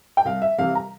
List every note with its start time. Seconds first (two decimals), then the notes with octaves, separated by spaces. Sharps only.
0.17 G5
0.25 C2 F5
0.42 E5
0.58 C3 E3 G3 F5
0.75 A#5